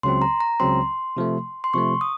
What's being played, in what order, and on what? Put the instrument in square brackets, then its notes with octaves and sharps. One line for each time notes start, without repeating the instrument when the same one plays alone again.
[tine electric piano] C#2 C#3 F#3 C4 [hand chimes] C6
[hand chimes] A#5
A#5
[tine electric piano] C#2 C#3 F#3 C4 [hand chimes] C6
[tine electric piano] C3 F3 A3
[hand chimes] C6
[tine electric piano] C3 F3 A3 [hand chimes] C#6
[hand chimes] D#6